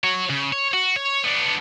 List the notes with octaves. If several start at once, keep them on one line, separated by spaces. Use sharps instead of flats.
F#4 C#5
C#3
C#5
F#4
C#5
B3 D4